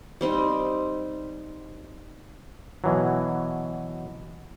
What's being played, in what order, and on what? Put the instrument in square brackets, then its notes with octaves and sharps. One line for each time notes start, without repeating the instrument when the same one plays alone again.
[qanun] G3 C4 D#4
[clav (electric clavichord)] B2 E3 F#3